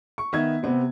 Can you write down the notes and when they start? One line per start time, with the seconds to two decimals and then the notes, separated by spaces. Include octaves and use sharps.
0.18 C#6
0.33 D#3 B3 E5 G#6
0.63 C3 B3 C4